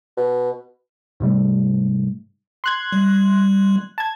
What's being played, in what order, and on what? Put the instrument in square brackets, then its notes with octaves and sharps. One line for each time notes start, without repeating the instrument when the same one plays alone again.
[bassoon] B2
[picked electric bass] G#2 C3 G3 A3
[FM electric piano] C6 F#6 G#6
[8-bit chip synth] G3
[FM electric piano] A5 G#6